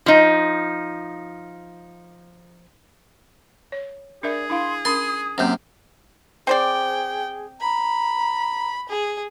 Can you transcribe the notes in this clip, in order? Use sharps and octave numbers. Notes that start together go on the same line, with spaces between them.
F3 D#4
C#5
D4 G#4 A#4 D5 E5
D4 E4 F5 C6
C#4 A#4 B5 C6 D#6
F#2 C3 A#3 C5
C4 G#4 C5 D5 G5
A#5 B5
G#4